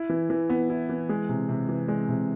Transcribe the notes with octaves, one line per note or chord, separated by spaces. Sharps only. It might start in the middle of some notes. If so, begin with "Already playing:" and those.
Already playing: E4
E3
E3
B3
E4
E3
G#3
C3
C3
E3
G#3
C3